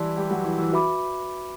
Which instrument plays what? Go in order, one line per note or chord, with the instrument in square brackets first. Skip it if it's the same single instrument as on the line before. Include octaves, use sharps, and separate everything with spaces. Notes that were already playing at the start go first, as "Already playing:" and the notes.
Already playing: [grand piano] E3 G3 E4 [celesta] B4 D5 A5 C6
[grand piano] G3 G4
F#3 F#4
E3 E4
E3 E4
[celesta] F#4 B4 E5 B5 D6